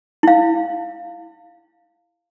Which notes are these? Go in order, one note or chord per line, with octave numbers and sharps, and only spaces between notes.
E4 F5